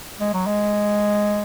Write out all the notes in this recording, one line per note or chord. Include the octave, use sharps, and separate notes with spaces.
G#3
F#3
G#3